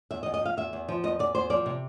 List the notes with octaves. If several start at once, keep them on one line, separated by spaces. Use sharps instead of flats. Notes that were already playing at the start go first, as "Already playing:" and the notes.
E2 E5
D#5
E2
D#5
F3 F5
E2 E5
E2
F3
E2 D#5
E2 D5
E2 C5
F3 D5
C3